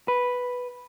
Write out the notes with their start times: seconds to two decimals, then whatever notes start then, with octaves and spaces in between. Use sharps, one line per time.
0.08 B4